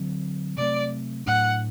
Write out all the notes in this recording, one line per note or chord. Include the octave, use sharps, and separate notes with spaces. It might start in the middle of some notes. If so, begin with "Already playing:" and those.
Already playing: D3 F#3 C4
C3 F#3 A3 C4 D5
A2 F#3 A3 D4 F#5